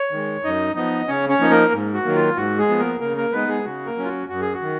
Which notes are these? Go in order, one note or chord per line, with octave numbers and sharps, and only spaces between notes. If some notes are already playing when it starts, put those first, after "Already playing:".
Already playing: C#5
D#3 G#3
F#2 D#4 D#5
F3 B3 D#4 D#5
C#3 C#4 C#5
C#4 C#5
F3 A#3 D#4
A#3 A#4
G#2
F#4
D#3 F#3 A#3
F4
G#2 F#4
G#3 G#4
F3 B3
A#3 A#4
C#3 A#3 A#4
A#3 A#4
G#3 B3 D#4 B4
G#3 G#4
C#3 F#4
A#3 A#4
F#3 C#4
F4
F#4
F#2 F#4
G#4
F#4
D#3